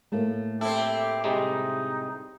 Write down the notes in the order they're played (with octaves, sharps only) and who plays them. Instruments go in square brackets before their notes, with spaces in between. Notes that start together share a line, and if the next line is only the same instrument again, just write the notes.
[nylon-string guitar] A2 A3 A#3
[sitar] C4 E4 [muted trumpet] G4 [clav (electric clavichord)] A4
[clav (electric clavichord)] C3 G3 G#3 [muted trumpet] D#4